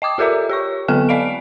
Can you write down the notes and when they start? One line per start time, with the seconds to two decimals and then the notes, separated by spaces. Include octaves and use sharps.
0.02 D#5 G5 D6 D#6
0.18 F4 G4 A4 A#4 D5 E5
0.49 G4 C#5 C#6
0.88 D3 F#3 B3 A4 G5 F6
1.09 D5 D#5 F5 G#5 D7